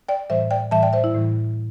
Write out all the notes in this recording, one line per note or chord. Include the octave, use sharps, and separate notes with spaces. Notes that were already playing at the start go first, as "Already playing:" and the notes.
D5 G5
A2 E3 G3 C5 E5
D5 G5
A2 E3 G3 E5 A5
D5 G5
C5 E5
E4
A2 E3 G3